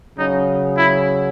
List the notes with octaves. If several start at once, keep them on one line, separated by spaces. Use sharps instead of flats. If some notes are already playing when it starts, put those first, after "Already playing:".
C#3 F#3 D#4
E4